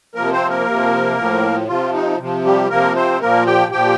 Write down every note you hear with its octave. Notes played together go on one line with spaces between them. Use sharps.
C3 F3 A#3 A#4
C4 C5
A#3 A#4
C3 F3
A2 F3
C3 F3 F4
D#4
C3 F3
G3 G4
C3 F3 A#3 A#4
C4 C5
A#2 F3 A#3 A#4
G4 G5
A#2 F3 G4 G5